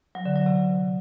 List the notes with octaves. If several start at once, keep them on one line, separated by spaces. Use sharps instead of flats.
F#3
D3
F#3
C3